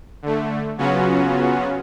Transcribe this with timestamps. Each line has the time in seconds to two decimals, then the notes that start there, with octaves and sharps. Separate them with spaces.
0.22 D3 A3
0.78 C#3 F#3 B3 C#4 F4 F#4